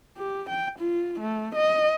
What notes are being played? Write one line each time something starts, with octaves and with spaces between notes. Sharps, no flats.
G4
G5
F4
A3
D#5